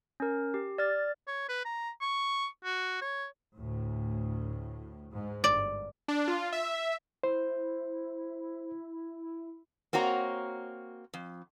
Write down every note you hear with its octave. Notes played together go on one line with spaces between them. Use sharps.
C#4 A#4
G4
D5 F6 A6
C#5
B4
A#5
C#6
F#4
C#5
D2 A2
G#2
G1 D5
D4
F4
E5
E4 C5
A#3 C4 F#4 C#5 A#5
F2